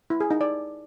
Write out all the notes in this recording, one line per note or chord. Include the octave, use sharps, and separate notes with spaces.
E4
G#4
D#4
D5